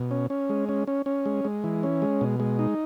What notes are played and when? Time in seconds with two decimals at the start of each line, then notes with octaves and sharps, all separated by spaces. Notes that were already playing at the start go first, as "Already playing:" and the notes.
Already playing: B2
0.11 C#4
0.30 C#4
0.49 G#3
0.69 C#4
0.87 C#4
1.06 C#4
1.26 G#3
1.45 G#3
1.64 E3
1.83 C#4
2.02 G#3
2.21 B2
2.40 G#3
2.59 D#4